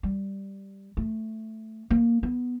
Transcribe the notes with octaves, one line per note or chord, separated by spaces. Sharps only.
G3
A3
A#3
B3